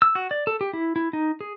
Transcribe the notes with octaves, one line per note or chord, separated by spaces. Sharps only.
E6
F#4
D5
A4
G4
E4
E4
D#4
G#4